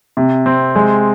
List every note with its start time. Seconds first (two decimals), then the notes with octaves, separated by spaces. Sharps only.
0.17 C3
0.46 C4
0.76 G#3